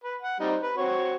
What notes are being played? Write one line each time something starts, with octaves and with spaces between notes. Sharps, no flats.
B4
F#5
G3 C4 D#4
B4
C4 F#4 C#5